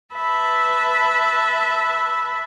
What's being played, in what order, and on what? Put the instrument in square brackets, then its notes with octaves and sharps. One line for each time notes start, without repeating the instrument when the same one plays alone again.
[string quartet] B4 E5 A5 B5